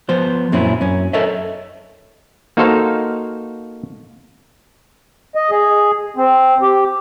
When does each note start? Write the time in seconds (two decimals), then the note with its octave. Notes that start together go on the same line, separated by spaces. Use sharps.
0.09 F3 B3 C5
0.52 F#2 A#2 C4 C#4 E4
0.81 F#2 C#4
1.13 A4 A#4 C#5 D#5 E5
2.57 A#3 D#4 F#4 A4 C5 F5
5.35 D#5
5.51 G#4
6.17 C4
6.62 G4